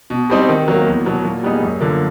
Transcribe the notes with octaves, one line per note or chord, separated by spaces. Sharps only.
B2
G3 C4 D#4
D#3
F#3 A#3
E2
B2 F#3
A#2
G3 B3 D#4 G#4
F#2
D3 F3 A#3